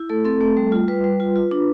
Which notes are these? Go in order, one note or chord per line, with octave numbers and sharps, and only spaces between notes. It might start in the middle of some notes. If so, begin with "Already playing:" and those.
Already playing: E4
A3 A4
C4 A4
A3
G3
F4
G3 B4
G3
F4
F4
D4